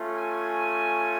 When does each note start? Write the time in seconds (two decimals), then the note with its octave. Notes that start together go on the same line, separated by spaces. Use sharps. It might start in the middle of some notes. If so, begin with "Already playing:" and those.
Already playing: A3 C#4 F4
0.18 G#5